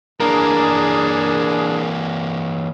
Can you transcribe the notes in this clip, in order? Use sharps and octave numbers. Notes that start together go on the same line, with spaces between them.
E3 A#3 D4 G#4 A#4